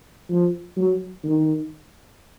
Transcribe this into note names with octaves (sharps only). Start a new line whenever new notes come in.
F3
F#3
D#3